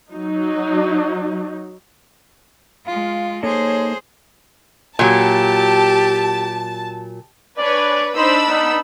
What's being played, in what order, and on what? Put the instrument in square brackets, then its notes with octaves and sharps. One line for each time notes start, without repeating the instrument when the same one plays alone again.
[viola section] F#3 D#4
[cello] G#3 F4 [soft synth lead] F5
[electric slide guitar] A#3 D#4 A4 [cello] G#4 C5 [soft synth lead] C#5
[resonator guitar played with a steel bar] A#2 F#3 [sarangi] G4 [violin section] A5
[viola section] D4 C#5 G#5 [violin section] B4 [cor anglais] D5
[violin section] D4 B5 E6 [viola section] D#4 C5
[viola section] B3 [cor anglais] D#4